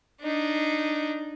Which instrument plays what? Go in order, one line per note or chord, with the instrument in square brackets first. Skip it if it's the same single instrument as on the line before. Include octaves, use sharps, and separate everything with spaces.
[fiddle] D4 D#4